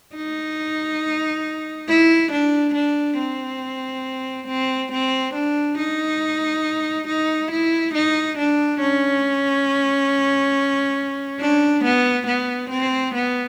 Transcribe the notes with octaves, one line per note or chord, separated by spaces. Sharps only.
D#4
E4
D4
D4
C4
C4
C4
D4
D#4
D#4
E4
D#4
D4
C#4
D4
B3
B3
C4
B3